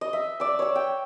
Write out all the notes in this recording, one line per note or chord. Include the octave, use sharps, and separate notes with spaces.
D#5
E5
D5 E6
C#5 E6
G5